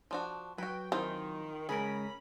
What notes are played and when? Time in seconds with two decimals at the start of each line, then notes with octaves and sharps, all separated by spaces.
0.11 F3 D4 F#4
0.58 F#3 F#4 B4 G5
0.92 D#3 E3 C4 D#4 F4 C5
1.69 C#3 G#3 C#4 G#4 A#4 A#5 B5